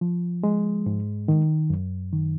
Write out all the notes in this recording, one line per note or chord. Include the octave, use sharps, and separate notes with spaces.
F3
G#3
G#2
D#3
F#2
D#3